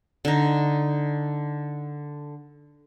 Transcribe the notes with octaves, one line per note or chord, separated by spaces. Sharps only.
D3 D#4